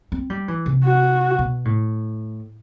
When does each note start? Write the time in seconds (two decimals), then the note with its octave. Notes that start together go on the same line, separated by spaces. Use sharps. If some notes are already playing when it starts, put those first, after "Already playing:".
0.12 C4
0.30 G3
0.48 E3
0.66 C3
0.84 F#4
1.39 B2
1.65 A2